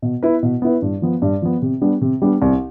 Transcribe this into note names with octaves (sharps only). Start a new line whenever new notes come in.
B2
B3 E4 B4
B2
B3 E4 B4
G2
F3 B3
G2
F3 B3
C3
G3 B3 D4
C3
G3 B3 D4
C2